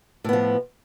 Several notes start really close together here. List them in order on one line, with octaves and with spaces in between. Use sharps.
A2 B3 F3